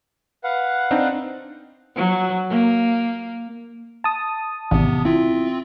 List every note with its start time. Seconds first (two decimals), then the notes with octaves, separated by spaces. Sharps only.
0.44 B4 F5 F#5
0.91 C4 D4 D#4
1.96 F#3
2.49 A#3
4.04 A5 D#6
4.71 A1 C3 B3
5.05 C4 E4 F4